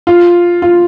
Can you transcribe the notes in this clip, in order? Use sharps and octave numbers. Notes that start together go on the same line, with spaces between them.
F4
F4